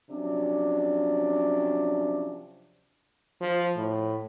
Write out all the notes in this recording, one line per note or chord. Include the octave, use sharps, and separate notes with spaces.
C3 F3 F#3 C#4 D4
F3
A2